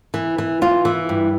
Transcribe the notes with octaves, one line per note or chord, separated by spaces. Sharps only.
E3
E3
E3 F4
E3
G2